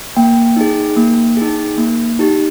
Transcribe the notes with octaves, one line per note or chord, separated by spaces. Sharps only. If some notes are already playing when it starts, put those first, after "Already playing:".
A#3 G5
D#4 G#4
A#3
D#4 G#4
A#3
D#4 G4